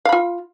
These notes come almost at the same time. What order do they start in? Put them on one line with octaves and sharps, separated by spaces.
F5 B5 F4